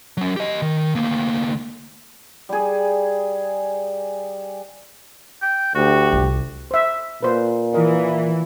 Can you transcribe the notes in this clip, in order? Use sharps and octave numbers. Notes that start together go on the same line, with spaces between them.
F#3 C#4
G4 D#5
D#3
D2 A#3
G3 G#4
G5
D2 F#4 G4
C2 F4
C5 E5
A#2 B4 C5
E3 A#4 D#5